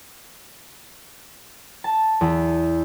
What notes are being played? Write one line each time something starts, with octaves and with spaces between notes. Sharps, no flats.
A5
E2